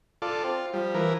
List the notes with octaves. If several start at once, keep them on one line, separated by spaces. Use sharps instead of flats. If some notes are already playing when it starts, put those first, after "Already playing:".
F4 A4 D5
C4 F4
F3 G3
E3 A#4 B4